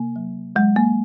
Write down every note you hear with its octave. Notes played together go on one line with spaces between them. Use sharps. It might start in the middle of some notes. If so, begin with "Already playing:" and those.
Already playing: C3 A#3
F#3
F#3 G#3
A#3